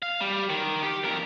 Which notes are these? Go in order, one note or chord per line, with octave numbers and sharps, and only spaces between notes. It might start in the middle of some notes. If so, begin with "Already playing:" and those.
F5
G3
D#3
G4
F2 A#4